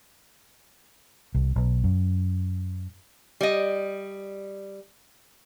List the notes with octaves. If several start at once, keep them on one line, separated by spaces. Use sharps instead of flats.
C2
B1
F#2
G3 D#5